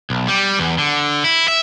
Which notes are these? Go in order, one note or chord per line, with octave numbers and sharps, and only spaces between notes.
B1
G3
E2
D3
E4
E5